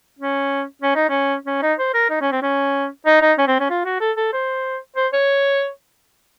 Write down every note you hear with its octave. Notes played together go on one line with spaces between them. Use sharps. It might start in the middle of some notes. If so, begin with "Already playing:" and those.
C#4
C#4
D#4
C#4
C#4
D#4
C5
A#4
D#4
C#4
C4
C#4
D#4
D#4
C#4
C4
C#4
F4
F#4
A4
A4
C5
C5
C#5